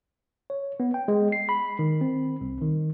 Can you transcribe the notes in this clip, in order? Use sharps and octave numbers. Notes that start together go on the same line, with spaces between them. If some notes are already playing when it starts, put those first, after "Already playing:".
C#5
B3
G5
G#3
C7
B5
D#3
C4
C2
D#3